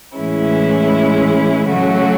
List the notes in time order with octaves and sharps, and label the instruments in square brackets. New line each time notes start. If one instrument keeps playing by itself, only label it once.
[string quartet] A2 E3 G#3 C#4 E4
C#3 F#3 A3 C#4 F#4